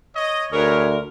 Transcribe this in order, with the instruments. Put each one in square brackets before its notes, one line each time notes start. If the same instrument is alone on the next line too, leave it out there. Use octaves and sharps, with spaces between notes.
[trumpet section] C#5 D#5
[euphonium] D2 [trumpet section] G#4 B4 C#5 [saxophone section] A#4